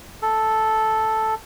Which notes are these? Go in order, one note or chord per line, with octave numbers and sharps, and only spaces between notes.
A4